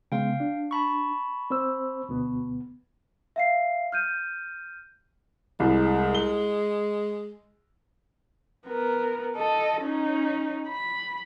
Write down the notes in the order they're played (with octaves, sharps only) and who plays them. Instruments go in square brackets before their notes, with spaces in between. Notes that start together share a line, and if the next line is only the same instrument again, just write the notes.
[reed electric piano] C#3 G#3 B3 [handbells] F5 G5
[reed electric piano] D4
[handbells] A5 B5 C#6
[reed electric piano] C4 C5 E6
D2 B2 B3
[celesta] E5 F5 C7
F6 G6 D#7
[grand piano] C2 [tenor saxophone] G#3
[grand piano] G7
[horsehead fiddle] B3 A#4
A4 D#5
C#4 D#4
B5